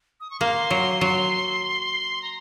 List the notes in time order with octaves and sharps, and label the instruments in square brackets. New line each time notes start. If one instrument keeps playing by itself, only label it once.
[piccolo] D#6
C#6
[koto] A#3 [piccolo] C6
[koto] F#3
F#3
[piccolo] A#5